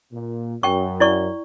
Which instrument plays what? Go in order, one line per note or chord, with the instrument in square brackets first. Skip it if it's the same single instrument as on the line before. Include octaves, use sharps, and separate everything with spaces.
[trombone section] A#2
[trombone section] F#2 [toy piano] G5 C#6
[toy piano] E4 D5 C#6